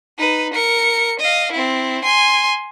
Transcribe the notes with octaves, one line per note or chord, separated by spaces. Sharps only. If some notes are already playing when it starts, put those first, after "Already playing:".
D#4 B4
A#4 C#7
D#5 F5
C4 E4
G#5 C6